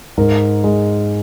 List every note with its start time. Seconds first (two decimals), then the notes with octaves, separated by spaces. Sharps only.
0.17 G#2 A#4
0.64 G#3